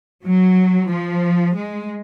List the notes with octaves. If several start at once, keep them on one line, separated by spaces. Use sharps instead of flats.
F#3
F3
G#3